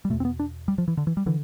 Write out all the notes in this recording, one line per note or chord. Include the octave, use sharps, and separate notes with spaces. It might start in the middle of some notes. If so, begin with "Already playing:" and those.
G3
E2 B2 A3
C4
B3
D4
G3
F3
E3
D3
E3
G3
D3 E3